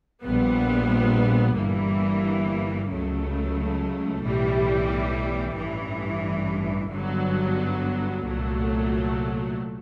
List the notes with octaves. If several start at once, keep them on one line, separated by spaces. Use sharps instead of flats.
A#1 A#2 G3 B3
G1 G2 E3 G3 A#3
C#2 C#3 F#3 A3
B1 A2 E3 G3
A1 G2 E3
G1 G2 D3 F#3 B3
C2 A#2 F#3 A3